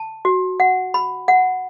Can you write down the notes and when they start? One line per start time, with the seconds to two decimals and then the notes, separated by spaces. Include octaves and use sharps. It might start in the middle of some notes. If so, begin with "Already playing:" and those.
Already playing: A5
0.25 F#4
0.60 F#5
0.94 B5
1.28 F#5